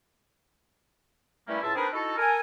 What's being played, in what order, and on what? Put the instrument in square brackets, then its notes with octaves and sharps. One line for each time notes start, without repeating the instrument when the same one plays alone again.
[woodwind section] G2 G3 A3 A#3 C#4 E4
C#2 A2 F4 E5 A5
C4 D4 D#4 G#4 A#4 B4
D#4 E4 F#4 A4
A4 A#4 G#5